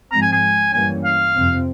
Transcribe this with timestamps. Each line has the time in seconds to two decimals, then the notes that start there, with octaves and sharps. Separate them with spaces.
0.11 G#2 F3 G#3 C4 A#5
0.22 G#5
0.33 G#5
0.73 G2 E3 G3 A#3 C#4 G#5
1.04 F5
1.35 F2 C3 F3 C4